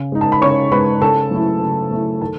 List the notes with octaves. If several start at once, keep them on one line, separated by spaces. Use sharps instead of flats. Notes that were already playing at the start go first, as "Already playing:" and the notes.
Already playing: C#3
G#3 D#4
A5
B5
C#3 C#5 C#6
G#3 D#4 B4 B5
C#3 A4 A5
F#3 A3 E4
C#3
F#3 A3 E4
D#3 A4 A5